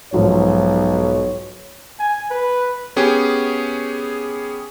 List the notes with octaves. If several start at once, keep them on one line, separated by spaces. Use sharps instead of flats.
B1 G#2 F3 F#3 C#5
G#5
B4
B3 C#4 G4 G#4